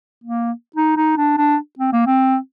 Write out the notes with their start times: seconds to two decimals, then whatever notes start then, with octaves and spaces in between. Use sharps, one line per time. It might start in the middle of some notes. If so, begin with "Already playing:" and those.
0.24 A#3
0.76 D#4
0.97 D#4
1.17 D4
1.37 D4
1.79 C4
1.93 A#3
2.07 C4